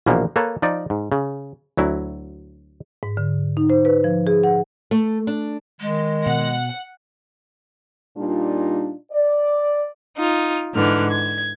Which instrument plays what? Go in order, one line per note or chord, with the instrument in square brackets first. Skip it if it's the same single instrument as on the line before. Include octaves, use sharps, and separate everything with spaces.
[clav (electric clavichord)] A#1 B2 E3 F3 A#3
A#3 A4 B4 C#5 A5
F3 D#4 D5
G#2
C#3
D2 F#3 E4
[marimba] G#2
D3
D#4
C5
B4
F3
G#4
F#5
[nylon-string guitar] A3
D4
[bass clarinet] D#3 [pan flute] G#3
[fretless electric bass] B2 [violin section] F#5
[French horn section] A#2 G3 D4 D#4 F4
D5
[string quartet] D#4 F4
G#2 D3 E3 F6
G#6